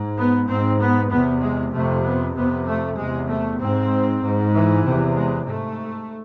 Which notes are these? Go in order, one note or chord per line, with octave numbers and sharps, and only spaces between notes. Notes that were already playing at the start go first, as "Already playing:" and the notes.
Already playing: G#2
B3
G#2 C4
B3
E2 C3 B3
G#3
F2 C3 A3
B3
F2 C3 B3
A3
E2 C3 G#3
A3
G#2 C4
G#2
E3
E2 C3
G#3
G#2 A3